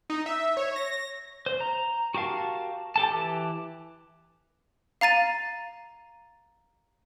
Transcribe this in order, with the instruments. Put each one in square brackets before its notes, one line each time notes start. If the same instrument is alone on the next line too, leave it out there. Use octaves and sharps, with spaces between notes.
[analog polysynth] D#4
E5
C#5
A#6
[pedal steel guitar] C5
A#5
F#4 G4 A#4 F5 A5
G4 A4 A5
E3 G4
[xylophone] F5 A#5 A6 D#7